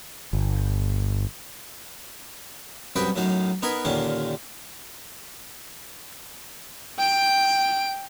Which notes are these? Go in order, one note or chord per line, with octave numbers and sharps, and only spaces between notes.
G1
C2 F#2 F#4 B4 D#5 G5
F#2 A2 F#3 D#4 F5
B3 D#4 A#4 B4 D#5 G#5
D#2 A#2 D3 D#3 A#3 C#4
G5 D7